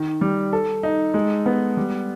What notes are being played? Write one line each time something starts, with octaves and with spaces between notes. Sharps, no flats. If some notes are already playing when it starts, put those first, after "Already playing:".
Already playing: D#3
G3
A4
D#4
G#3
B3
G3